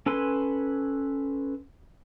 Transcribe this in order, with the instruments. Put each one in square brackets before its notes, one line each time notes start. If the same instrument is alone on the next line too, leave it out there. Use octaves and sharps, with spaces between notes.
[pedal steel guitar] C#4 A4 B4 G#5 C6